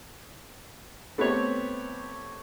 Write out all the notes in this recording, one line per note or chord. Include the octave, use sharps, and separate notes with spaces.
A3 B3 C4 G4 C#5